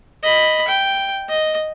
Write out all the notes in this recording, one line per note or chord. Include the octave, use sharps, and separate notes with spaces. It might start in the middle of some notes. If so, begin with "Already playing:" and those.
D#5 B5
G5
D#5